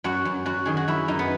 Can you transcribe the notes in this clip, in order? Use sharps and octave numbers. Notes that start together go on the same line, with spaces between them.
F#2 F#4
F#2
F#2 F#4
D#3 G#4
F#4
F#2 E4
F#2 D#4
B3